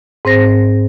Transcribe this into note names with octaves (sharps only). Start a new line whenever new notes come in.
G#2 C4 C5 A#6